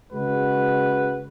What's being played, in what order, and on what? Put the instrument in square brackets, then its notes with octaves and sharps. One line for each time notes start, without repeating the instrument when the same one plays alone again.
[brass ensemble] C#3 G#3 F#4 B4